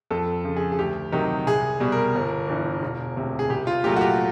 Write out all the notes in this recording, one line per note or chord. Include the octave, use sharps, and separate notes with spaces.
F2 A4
C#3 F3
G#4
G#4
D2 G4
C3 D#3 F#3 G4
C2 G#4
B2 G3
A#4
G1
G2 E3
E1
D2 C3
G#4
C2 G4
F4
A#2 F#3 A3 G4
F#4
G4